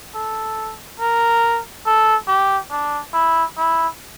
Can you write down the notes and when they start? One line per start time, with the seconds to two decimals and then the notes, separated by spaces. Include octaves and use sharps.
0.14 A4
1.00 A#4
1.86 A4
2.28 G4
2.71 D4
3.13 E4
3.57 E4